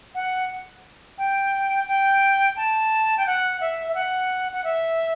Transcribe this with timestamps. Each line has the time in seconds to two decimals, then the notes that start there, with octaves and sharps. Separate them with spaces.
0.15 F#5
1.18 G5
1.87 G5
2.56 A5
3.17 G5
3.26 F#5
3.61 E5
3.88 E5
3.95 F#5
4.52 F#5
4.64 E5